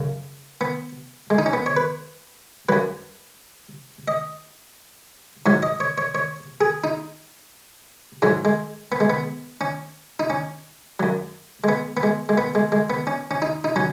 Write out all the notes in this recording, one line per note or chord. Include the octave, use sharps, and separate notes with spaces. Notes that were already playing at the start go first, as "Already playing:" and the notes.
Already playing: F#2 C#3
B3
G#3
D#4
C#4
B3
C#5
B4
F#2 F#3 B4
D#5
G#2 F#3 C#5
D#5
C#5
C#5
C#5
G#4
D#4
G#2 F#3 G#3
G#3
B3
G#3
B3
C#4
D#4
C#4
F#2 F#3
G#3
B3
B3
G#3
G#3
B3
G#3
G#3
B3
C#4
C#4
D#4
D#4
F#3 C#4